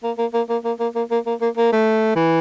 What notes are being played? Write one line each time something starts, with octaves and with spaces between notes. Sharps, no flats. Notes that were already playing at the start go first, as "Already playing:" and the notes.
A#3
A#3
A#3
A#3
A#3
A#3
A#3
A#3
A#3
A#3
A#3
A3
E3